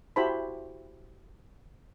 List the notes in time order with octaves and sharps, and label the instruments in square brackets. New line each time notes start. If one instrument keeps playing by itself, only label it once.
[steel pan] E4 F#4 G4 C5 A5 B5